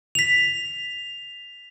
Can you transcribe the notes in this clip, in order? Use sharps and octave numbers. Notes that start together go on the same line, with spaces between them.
B6 F7